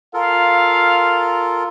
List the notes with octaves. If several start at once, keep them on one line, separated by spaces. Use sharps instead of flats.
F4 A4 A#4 F5